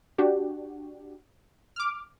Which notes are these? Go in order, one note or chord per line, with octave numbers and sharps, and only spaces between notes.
D4 F#4 G4
D6 F6